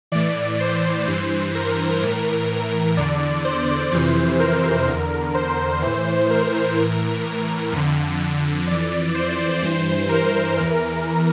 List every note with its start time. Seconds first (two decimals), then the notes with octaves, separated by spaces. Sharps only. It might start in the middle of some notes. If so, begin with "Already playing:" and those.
0.12 A2 E3 D5
0.60 C5
1.07 G2 E3
1.55 A#4
2.02 A2 E3
2.97 E2 D3 D5
3.45 C5
3.92 F2 C3 E3
4.39 A#4
4.87 E2 D3
5.35 C5
5.82 A2 E3
6.30 A#4
6.77 A2 E3 A#4
7.72 F2 D3
8.67 F2 E3 D5
9.15 C5
9.62 G2 E3
10.09 A#4
10.57 E2 E3 A#4